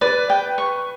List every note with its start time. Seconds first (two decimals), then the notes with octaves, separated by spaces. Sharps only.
0.01 B4 D5
0.30 G5
0.58 C#6